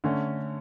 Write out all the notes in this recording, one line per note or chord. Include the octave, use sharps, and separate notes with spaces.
D3 A3 C#4